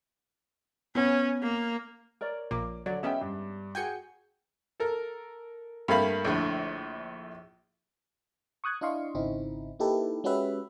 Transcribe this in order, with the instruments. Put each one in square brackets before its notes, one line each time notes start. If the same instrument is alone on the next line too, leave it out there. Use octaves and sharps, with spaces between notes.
[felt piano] B3 [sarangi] C#4
[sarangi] A#3
[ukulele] A#4 C#5 D5
[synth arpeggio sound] A#1 A#2 A#3 [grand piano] D6
[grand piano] D3 [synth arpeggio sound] F#3 [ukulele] D5
[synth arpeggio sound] G#3 B3 C#4 [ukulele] E5 [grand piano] G5 E7
[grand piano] G2 [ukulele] D4
[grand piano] F#4 G#4 [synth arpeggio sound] G5 G#5 C#7
[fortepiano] A4 A#4
G2 A3 A#3 F5 B5
A#1 A2 D3
[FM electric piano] C#6 D#6 F#6 G#6
D4 E4 D#5 F5 C6 C#6
G#1 C#3 C4 D#4 E4
A#3 D#4 E4 G4 A4 B4
G#3 C#4 F#4 G4 B4 E5